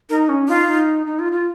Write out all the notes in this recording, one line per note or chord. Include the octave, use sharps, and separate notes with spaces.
D#4 A#4
C#4
D#4 F4
D#4
D#4
F4
F4